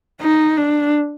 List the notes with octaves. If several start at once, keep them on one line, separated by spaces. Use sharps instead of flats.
D#4
D4